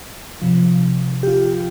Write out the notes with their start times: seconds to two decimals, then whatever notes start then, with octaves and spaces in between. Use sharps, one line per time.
0.42 C3 F3
1.23 G4
1.27 F4